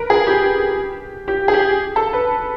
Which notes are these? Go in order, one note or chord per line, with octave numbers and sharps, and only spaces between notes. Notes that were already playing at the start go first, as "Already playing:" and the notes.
Already playing: A#4 B4
G#4
G4
G4
G#4
G4
A4
B4